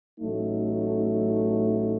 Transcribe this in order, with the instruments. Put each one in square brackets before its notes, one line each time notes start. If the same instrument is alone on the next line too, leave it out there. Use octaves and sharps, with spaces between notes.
[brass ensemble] A1 A2 F#3 A3 D#4